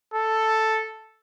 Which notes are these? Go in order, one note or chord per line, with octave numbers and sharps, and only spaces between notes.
A4